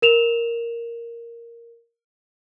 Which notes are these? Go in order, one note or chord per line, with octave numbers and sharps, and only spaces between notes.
A#4 E7 F7